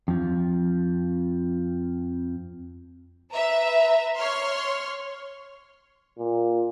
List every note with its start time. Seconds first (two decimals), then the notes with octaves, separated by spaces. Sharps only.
0.08 F2 F3
3.33 B4 E5 A#5
4.18 C#5 C6 F6
6.19 A#2